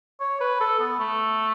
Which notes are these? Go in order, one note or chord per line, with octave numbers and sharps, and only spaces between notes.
C#5
B4
A4
B3
A3